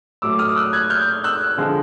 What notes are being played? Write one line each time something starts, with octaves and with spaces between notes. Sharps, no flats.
A2 F#3 A3 D6 E6
D#6 F6
E6 F#6
F#6 G#6
F6 G6
E6 F#6
D3 F3 G#3